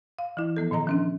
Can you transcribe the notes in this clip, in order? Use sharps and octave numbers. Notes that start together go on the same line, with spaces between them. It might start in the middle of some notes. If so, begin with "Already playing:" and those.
F5
E3 E4
F3 B3 A4
A#2 D#3 D#5 A#5
F3 C#4 D4